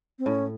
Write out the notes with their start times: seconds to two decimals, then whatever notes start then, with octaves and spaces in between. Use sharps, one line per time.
0.19 C4
0.26 A2 C#4